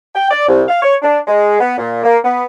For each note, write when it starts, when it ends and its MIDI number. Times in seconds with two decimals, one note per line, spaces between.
0.14 0.30 79
0.30 0.44 74
0.48 0.62 36
0.68 0.82 77
0.82 0.94 73
1.02 1.18 62
1.26 1.57 56
1.59 1.75 59
1.78 2.00 46
2.03 2.17 58
2.24 2.45 59